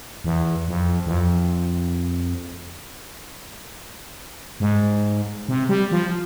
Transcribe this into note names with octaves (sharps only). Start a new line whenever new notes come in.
E2
F2
E2
F2
G#2
C3
G3
F3